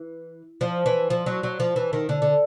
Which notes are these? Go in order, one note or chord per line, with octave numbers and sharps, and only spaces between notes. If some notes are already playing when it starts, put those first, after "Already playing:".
Already playing: E3
F3
E3
F3
F#3
F#3
F3
E3
D#3
D3
D3